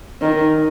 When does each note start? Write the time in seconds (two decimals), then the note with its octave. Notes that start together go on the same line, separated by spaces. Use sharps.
0.22 D#3